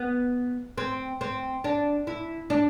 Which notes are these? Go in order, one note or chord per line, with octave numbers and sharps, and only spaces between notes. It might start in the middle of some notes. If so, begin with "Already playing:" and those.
Already playing: B3
C4
C4
D4
E4
D4